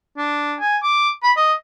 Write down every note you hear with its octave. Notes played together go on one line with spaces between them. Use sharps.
D4
G#5
D6
B5
D#5